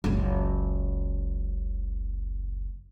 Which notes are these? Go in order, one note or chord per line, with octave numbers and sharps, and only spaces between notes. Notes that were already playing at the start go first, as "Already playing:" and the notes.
F#1 C#2